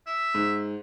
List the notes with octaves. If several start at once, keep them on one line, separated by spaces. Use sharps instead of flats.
E5
G#2